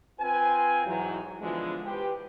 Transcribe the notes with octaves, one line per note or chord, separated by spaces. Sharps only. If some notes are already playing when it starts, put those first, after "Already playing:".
C4 F4 B4 G#5
G#2 E3 F#3
B2 D3 E3 F3 G#3
G4 B4 C5